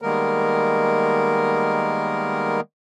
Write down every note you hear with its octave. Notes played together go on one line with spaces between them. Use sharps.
D#3 G3 G#3 A#3 B3 A#4